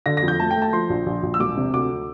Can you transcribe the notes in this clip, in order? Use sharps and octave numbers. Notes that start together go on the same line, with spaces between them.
D3 A#6
A#6
F2
G6
A3 A5
G5
A3
A5
F3 C6
A#1
A#1
A#1
E6
E1 D6
C3
D2 D6